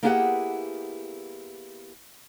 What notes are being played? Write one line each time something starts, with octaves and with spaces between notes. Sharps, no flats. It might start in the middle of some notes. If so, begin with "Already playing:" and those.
A#3 B3 E4 G4 G#4 F#5